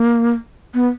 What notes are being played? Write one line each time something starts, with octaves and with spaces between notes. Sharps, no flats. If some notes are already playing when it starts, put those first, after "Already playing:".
Already playing: A#3
B3